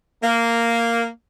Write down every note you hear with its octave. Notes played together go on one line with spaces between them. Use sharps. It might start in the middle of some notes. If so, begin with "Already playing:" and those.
A#3